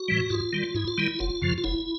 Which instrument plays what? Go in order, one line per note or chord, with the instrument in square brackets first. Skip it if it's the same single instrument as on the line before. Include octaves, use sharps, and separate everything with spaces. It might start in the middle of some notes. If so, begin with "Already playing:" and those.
Already playing: [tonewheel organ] F#4
A2 E3 G3
G#2 F4
D#3 G3
G#2 E4
F4
D#3 G3 E4
F#1 F4
F#2 C#3 F3
F4
F#1 E4